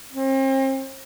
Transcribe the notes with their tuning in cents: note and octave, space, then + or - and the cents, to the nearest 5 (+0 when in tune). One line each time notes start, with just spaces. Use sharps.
C4 +40